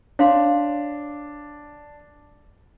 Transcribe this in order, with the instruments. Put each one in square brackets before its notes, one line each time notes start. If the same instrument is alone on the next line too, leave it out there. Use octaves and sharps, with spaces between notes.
[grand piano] D4 [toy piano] C#5 F5 C6